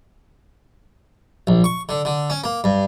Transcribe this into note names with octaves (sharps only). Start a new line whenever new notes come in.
A#1
C#6
D3
D3
C#4
A#3
G2